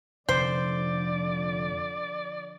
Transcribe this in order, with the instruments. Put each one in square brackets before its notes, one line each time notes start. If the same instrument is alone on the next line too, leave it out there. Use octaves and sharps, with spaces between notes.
[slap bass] F1 [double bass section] D3 F3 [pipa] C5 [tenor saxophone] D5